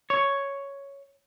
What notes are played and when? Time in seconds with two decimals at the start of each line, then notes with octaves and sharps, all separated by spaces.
0.10 C#5